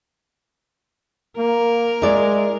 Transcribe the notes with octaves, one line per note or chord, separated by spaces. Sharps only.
A#3 A#4
G#3 E4 D5